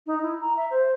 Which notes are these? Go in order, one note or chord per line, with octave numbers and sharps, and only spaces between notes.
D#4
E4
A#5
E5
C5